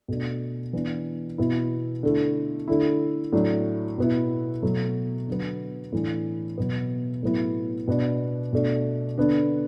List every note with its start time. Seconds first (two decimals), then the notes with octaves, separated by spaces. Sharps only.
0.08 B2 A3 D4
0.73 E3 B3 D4
1.38 B2 B3 E4
2.03 D3 A3 E4
2.68 D3 A3 E4
3.32 A2 F#3 D4
3.98 B2 B3 E4
4.62 B2 F#3 A3
5.28 D3 F#3 B3
5.92 A2 E3 D4
6.58 B2 F#3 B3
7.23 A2 F#3 B3 E4
7.88 B2 B3 D4
8.53 B2 A3 D4
9.18 D3 B3 D4